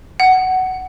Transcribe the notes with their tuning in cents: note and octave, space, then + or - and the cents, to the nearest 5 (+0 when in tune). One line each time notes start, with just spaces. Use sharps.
F#5 +15